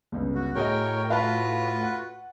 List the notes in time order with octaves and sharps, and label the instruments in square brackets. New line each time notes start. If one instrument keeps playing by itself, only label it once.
[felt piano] G1 C#2
[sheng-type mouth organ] F#4
[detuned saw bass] A2 [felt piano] F#4 G#4 D#5 [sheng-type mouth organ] A#4 C#5 G5
[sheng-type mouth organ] F4 F#4 B4 [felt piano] F5 A5 B5
[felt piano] F#5